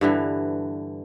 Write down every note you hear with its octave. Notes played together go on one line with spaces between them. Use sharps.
G2 D3 E3